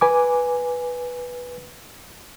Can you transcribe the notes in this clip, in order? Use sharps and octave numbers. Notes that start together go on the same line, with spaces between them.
B4 G#5 D6